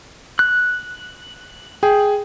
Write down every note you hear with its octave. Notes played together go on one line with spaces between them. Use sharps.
F#6
G#4 G5